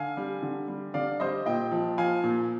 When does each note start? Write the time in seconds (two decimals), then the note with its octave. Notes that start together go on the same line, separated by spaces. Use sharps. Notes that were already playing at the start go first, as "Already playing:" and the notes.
Already playing: D3 F5 G#5
0.17 G3
0.42 D3
0.68 G3
0.94 D3 D5 F5
1.20 G3 C5 D#5
1.46 A#2 D#5 G5
1.71 F3
1.98 F3 F5 G#5
2.23 A#2